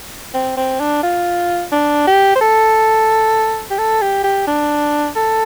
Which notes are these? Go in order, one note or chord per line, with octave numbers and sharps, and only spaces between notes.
C4
C4
D4
F4
D4
G4
C5
A4
G4
A4
G4
G4
D4
A4